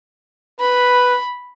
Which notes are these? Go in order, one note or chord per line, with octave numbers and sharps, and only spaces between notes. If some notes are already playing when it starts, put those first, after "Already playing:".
B4 B5